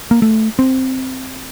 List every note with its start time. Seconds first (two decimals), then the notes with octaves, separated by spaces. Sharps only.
0.11 A#3
0.22 A3
0.59 C4